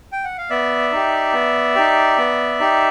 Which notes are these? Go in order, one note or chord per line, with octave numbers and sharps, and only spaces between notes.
G5
F#5
F5
B3 D5 E5
D#4 G4
B3
D#4 G4
B3
D#4 G4